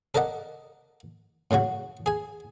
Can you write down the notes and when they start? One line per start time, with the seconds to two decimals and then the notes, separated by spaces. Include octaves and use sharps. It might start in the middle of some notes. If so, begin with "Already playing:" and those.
0.15 A4 A#4 D5 D#5 F#5
1.51 A2 C#3 F#3 F#4
2.06 G#4 G#5